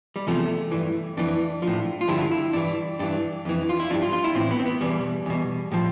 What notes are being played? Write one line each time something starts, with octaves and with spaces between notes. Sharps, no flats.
G3
E2 C3 F3 A3
G2 E3
F2 E3 D4
A2 F3
F4
G2 D3 F3 E4
E4
G2 E3 D4
G2 E3 D4
F2 E3
F4
E4
G2 F3 D4
F4
F4
E4
A2 E3 C4
B3
C4
B3
E2 B2 G3
E2 B2
A2 F3